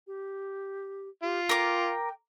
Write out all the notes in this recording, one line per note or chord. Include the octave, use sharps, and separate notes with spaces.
G4
F4 G4
A#4 G5 D6